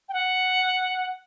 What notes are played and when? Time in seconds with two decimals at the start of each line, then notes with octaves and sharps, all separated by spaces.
0.09 G5
0.13 F#5